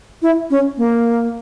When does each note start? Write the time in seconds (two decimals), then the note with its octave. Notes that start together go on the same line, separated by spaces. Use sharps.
0.22 E4
0.50 C#4
0.78 A#3